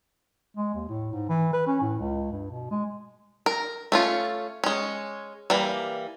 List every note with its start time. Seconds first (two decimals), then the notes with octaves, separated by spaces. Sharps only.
0.57 G#3
0.74 D#2
0.89 A2
1.13 G#2
1.29 E3
1.53 B4
1.67 C#4
1.81 A2
1.99 C#2
2.32 G2
2.51 B2
2.71 G#3
3.46 A#4
3.92 A3 C#4 F4
4.64 G#3 C#4
5.50 E3 G3 A#3